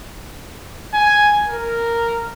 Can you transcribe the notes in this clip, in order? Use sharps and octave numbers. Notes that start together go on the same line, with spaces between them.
G#5
A#4